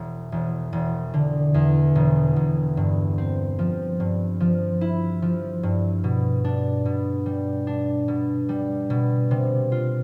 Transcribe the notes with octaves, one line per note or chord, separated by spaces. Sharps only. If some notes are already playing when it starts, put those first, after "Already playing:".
Already playing: E1
E1
E1
D3
E2
E1
E1
G2
C4
F3
G2
F3
E4
F3
G2
B2
D4
B2
G3
D4
B2
G3
B2
C3
F4